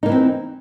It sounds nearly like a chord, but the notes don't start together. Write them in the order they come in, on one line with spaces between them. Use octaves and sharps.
D#4 A#3 E3 C4